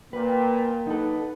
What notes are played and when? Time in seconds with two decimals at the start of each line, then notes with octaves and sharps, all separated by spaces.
0.13 A#2 A#3 B4 G5
0.87 D#4 A4 B4 F#5